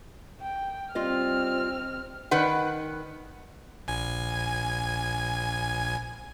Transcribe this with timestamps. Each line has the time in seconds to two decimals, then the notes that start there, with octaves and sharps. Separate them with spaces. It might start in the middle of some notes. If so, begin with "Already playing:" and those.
0.41 G5
0.95 G3 C4 F4 D#5 F6
2.31 D#3 B4 F#5
3.88 A#1 G#5 G#6